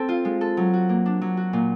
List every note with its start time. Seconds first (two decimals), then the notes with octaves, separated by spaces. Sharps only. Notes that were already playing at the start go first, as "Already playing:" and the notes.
Already playing: C4 A4
0.09 F4
0.25 G#3
0.41 A4
0.57 F#3
0.73 F#4
0.89 A#3
1.06 D4
1.21 F#3
1.37 F#4
1.53 A#2